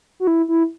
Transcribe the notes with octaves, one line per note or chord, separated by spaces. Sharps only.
F#4
E4
E4